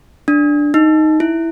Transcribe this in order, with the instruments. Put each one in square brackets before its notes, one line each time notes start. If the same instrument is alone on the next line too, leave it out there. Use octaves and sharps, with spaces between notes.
[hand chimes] D4
D#4
E4